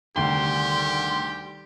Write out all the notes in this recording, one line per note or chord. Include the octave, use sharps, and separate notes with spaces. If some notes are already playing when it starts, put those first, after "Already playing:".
D2 C3 D#3 G3 G4 G5 C6